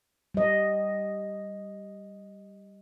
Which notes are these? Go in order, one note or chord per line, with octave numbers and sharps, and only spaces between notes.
G3 D#5